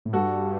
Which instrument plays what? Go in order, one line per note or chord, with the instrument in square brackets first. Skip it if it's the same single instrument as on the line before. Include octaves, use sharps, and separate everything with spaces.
[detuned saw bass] A2
[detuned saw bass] G2 [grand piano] F#4 A4